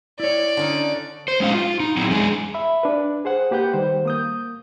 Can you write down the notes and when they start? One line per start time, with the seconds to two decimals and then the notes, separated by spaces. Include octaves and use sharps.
0.20 E4 C#5 D5
0.57 D3 C#4 D#4
1.28 C5
1.40 G#3 C#4 D#4 F5
1.54 F4
1.80 D#4
1.97 F#3 C4 E4
2.11 E2 G#3 D4 G#4
2.54 E5 B5
2.83 D4 B4
3.25 G#4 C5 F#5
3.51 A#3 G4 B4 F#5 G6
3.73 D#3 G3 C5
4.05 A#3 D#6 G6